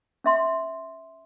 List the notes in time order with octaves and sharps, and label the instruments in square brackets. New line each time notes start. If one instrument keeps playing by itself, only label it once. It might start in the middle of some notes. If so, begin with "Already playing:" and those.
[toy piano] C#4 E5 C6